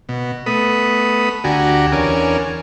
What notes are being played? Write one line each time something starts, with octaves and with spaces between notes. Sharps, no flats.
B2
A3 B3 B5 D#6
D2 D4 F#4 G4 G#5 A#5
E2 C#4 D4 A#4 G#5